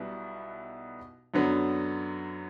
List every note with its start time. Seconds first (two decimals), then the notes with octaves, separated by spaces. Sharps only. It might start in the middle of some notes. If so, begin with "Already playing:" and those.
Already playing: B1 B2 G3 B3 E4
1.34 F#2 D3 F#3 B3